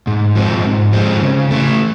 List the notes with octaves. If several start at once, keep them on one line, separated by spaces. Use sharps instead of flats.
G#2
F3 G#3 C4
G#2
F3 G#3 C4
C#3
E3 A3